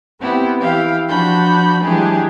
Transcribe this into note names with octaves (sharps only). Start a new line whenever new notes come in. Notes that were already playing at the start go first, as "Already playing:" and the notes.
B3 C4 E4 G4
E3 E4 G4 F5
F3 D4 F#4 B5 G6
E3 F#3 G#3 D4 G4 G#4